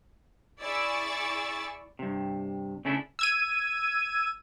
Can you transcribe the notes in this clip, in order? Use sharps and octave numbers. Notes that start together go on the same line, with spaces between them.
E4 G#4 D5 C#6 E6 A6
G2 C3
C#3 A3 C#4 D4 E4
E6 G#6 D#7